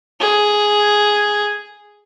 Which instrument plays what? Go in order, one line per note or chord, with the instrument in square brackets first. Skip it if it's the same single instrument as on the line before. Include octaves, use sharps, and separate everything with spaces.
[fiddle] G#4